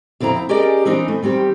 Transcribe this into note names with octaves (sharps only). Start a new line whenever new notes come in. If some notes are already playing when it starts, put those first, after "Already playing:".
F2 D3 C4 E4 A#5
C#4 G4 G#4 A#4 D5 D#5
E3 C4 D4 D#4 D#5
A3
D#3 G3 C4 G4